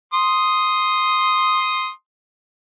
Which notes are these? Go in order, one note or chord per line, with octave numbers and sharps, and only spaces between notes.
C6 D#6